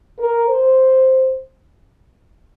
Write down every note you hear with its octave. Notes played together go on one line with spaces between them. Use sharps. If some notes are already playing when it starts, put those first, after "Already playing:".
A#4
C5